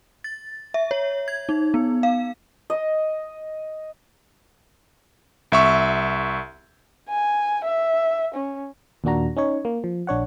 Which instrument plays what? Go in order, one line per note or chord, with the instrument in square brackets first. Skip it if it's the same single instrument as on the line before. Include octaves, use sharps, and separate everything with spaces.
[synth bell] A6
E5
C#5
G#6
D#4
B3
F5
[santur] D#5
[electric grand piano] C2 E5 C#6
[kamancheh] G#5
E5
C#4
[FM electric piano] D#2 A#2 A#3 D4 F#4 A#5
C#4 D#4 C#5
A#3
F3
A#1 D4 C#5 F#5